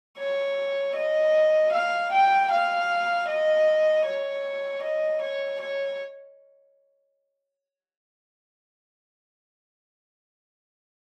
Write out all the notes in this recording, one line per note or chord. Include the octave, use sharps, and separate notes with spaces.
C#5
D#5
F5
G5
F5
D#5
C#5
D#5
C#5
C#5